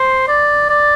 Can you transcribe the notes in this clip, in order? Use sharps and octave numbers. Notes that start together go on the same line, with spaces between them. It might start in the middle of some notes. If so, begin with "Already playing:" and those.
Already playing: C5
D5
D5